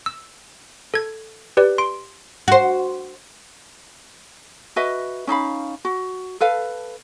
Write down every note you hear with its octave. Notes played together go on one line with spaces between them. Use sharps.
E6
A4 G#6
G4 B4 D5
C6 D7
F#4 C5
F#4 B4 D#5 E5
C#4 D#4 F5 B5
F#4
A4 B4 F5